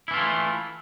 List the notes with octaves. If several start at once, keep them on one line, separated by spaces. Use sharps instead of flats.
E3 A3 E4 F4